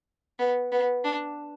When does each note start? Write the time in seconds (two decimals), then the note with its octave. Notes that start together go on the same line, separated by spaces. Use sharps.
0.39 B3
0.72 B3
1.04 D4